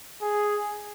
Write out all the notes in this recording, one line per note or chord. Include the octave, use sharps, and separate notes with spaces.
G#4